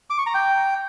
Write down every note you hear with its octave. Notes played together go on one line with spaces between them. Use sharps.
D6
C#6
A#5
G5